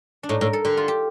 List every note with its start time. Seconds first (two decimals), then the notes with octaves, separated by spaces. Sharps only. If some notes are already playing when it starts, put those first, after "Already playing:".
0.23 D4
0.29 A2 D#4
0.41 A2 A#4
0.53 A4
0.65 D3 G4
0.77 F4
0.88 G4